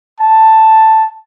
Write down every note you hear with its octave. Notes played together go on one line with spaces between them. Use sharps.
A5